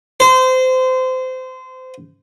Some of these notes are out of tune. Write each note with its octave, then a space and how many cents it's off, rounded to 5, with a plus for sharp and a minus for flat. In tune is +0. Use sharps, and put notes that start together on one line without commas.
C5 -25